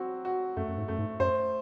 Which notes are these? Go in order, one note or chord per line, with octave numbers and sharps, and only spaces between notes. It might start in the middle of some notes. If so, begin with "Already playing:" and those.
Already playing: F#3 C4 F#4
F#4
F#2 A3
F#2
G#2
F#2 A3
G#2
F#2 C5